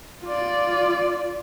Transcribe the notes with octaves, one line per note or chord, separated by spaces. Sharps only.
F4 D5